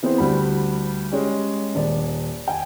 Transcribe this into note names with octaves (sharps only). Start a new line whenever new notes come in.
E3 B3 C4 G#4 C5
D2 G3 B5
G#3 C#4 G4
D#1 D5
G5 G#5